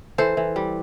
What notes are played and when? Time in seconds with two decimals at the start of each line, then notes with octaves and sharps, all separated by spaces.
0.18 E3 A4 C5
0.37 E3
0.56 G3